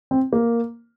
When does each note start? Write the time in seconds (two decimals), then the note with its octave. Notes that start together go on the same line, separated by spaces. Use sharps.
0.11 C4
0.33 A#3